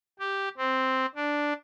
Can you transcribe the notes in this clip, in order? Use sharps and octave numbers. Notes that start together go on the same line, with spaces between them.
G4
C4
D4